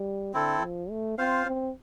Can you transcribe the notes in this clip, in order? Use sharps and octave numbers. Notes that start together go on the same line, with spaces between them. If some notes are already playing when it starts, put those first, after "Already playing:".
Already playing: G3
D3 C4 E4 A4
F3
A3
C4 F4 C5 F5
C4